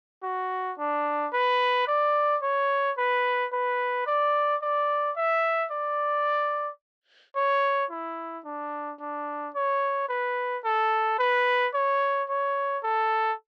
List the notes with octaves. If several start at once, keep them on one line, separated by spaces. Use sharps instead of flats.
F#4
D4
B4
D5
C#5
B4
B4
D5
D5
E5
D5
C#5
E4
D4
D4
C#5
B4
A4
B4
C#5
C#5
A4